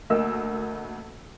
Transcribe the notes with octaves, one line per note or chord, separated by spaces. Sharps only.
D2 A#3 D#5 E6